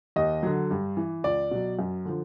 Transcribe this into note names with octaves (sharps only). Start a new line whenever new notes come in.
D#2 D#5
D3 F#3
G2
E3
C#2 D5
B2 F#3
F#2
D3 F3